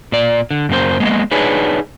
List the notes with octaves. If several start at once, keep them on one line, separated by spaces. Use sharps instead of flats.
A#2 D5
D3
F#2 C#3 A#3 C5
G#3 A#3 B3 D#5
D4 D#4 G#4 B4 C#5